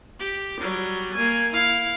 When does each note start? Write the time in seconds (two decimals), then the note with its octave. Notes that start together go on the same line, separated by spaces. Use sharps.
0.20 G4
0.60 F#3 G3
1.14 A#3 G#5
1.49 E4 F5